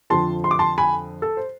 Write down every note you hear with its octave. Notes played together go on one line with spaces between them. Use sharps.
F2 D3 F3 A5 C6
C6
D6
A5 C6
G#5 B5
A4
C5